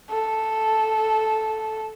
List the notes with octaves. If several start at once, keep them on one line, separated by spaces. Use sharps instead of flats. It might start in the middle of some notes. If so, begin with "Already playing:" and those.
A4